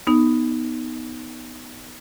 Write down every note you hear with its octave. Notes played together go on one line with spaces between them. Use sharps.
B3 D#4